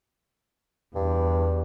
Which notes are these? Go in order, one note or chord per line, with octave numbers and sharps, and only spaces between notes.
E2 G2